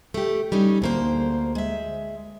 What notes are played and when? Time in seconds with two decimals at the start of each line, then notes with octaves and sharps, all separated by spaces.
0.14 A3 G4
0.52 G3 C#4 D#4
0.82 D2 A#3 C5
1.55 G#3 E5